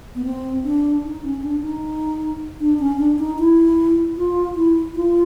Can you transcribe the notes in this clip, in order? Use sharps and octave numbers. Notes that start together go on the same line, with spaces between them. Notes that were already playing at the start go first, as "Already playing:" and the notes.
B3
C4
D4
D#4
C#4
D4
D#4
D4
C#4
D4
D#4
E4
F4
E4
F4